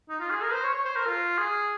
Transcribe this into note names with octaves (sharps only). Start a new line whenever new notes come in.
D#4
F4
G#4
A#4
C5
C#5
C#5
C5
A#4
F4
G#4